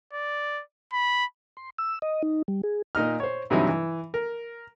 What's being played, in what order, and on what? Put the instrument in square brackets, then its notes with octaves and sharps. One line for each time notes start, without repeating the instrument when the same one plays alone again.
[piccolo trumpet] D5
B5
[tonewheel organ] C6
E6
D#5
D#4
G3
G#4
[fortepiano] A#2 D#4 D#5 F6
C5 C#5
G2 C3 E3 F#3 D#4 E4
E3
A#4